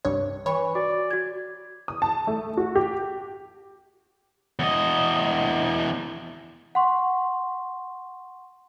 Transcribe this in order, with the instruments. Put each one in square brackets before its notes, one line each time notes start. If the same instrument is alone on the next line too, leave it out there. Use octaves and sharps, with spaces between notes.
[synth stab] C2 G2 C#5
[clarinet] E3 [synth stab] C#5 C#6 [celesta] B5
[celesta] F#4 [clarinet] D5
[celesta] F#4 G#6
[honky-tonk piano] D#6
A5
A3
F#4
G4
[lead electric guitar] E2 D#5
[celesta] F#5 C6 C#6